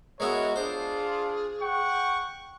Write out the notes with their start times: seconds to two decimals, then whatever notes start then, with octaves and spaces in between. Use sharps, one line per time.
0.20 G#3 B3 E4 F#4 A#4 C#5
0.56 D4 F4 G#4 C5
1.62 F#5 G5 C#6